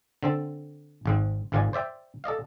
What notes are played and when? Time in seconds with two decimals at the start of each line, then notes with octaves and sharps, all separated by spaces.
0.23 D3 C4 A4
1.06 G#1 G#2 C4
1.52 G#1 G#2 D#3 F4 D5 G#5
1.73 C5 D5 E5 G5
2.24 A4 D5 D#5 F5